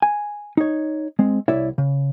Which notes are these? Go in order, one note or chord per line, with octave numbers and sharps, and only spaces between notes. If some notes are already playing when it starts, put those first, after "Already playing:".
G#5
D#4 C#5
G#3 C4
C2 E4 C#5 D5 E5
C#3